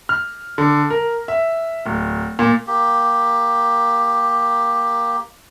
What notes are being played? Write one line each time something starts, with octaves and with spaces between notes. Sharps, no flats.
F6
D3
A#4
E5
D1
A#2
A#3 G4